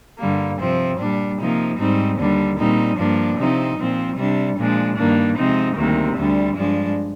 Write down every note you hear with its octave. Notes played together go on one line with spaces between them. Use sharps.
G2 D3 G3 A#3
C3 F3 C4
A#2 G3 D4
C3 F3 A#3 D#4
G#2 G3 C4 D#4
D#2 D3 G3 D4
A#2 G3 C4 D#4
G2 F3 A#3 D4
C3 F3 C4 D#4
A#2 F3 C4
C3 G3 D4
A#2 F3 G#3 D4
G2 D#3 A#3 D4
C3 F3 G#3 C4 D#4
D2 C3 D#3 G3 A#3
D2 D3 G3 D4
G2 F3 G#3 D4